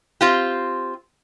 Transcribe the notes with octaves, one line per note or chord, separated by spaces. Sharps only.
C4 F4 G4